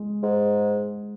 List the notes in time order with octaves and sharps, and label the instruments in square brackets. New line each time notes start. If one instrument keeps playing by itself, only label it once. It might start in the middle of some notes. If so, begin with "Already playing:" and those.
Already playing: [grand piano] G#3
[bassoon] G#2